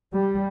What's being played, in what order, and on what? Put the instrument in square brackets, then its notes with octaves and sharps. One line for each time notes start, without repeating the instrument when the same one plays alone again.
[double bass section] G3